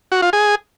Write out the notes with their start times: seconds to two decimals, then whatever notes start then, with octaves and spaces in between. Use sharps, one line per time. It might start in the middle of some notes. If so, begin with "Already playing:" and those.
0.12 F#4
0.22 F4
0.33 G#4